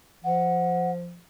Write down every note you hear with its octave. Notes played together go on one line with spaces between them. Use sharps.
F3 F#5